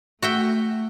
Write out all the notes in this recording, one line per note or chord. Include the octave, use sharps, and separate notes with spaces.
A3 F#4 E5 G5